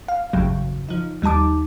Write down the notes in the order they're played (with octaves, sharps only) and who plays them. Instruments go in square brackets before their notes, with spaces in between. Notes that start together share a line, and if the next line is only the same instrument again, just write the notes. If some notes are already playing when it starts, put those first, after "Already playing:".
[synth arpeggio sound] F5
G#1 E2 G2 C#3 F#3
F3 D#4
D#2 G3 D#4 A5 D6